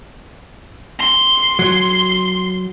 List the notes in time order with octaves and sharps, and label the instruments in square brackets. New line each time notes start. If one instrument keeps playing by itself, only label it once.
[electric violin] C6
[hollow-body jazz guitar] F#3